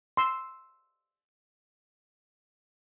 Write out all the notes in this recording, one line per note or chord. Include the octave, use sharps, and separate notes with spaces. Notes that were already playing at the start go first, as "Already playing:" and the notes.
C6 E6